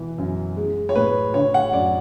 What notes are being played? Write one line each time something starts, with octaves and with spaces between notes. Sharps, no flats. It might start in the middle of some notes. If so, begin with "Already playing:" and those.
Already playing: B2 E3
F#2
G#3
C#5
A2 B4
D3 C#5
F#5
F#2 D5